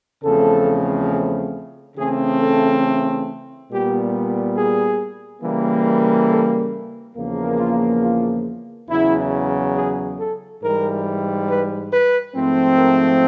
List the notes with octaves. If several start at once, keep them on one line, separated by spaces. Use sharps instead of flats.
E2 C#3 F3 A3 C4 A4
C#3 E3 A3 C4 G#4
A4
A#2 G3 B3 G4
G#4
C#3 E3 G3 A#3
A4
E2 C#3 F3 A#3
F4
F4
E2 C#3 F#3 E4
G#4
A4
G#2 E3 G3 A#4
B4
B4
G#2 F3 A3 C4
A#4